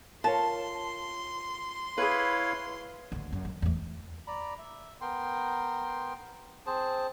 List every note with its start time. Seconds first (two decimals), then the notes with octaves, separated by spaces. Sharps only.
0.24 F4 A#4 C#5 A5 C6
1.98 E4 G#4 B4 C#5 F5
3.12 D2 D#3
3.32 F#2
3.45 D#3
3.62 E2 A3
4.27 D5 A#5 B5
4.59 E5
5.01 B3 A#4 G5 C6
6.66 C4 G#4 C5 A5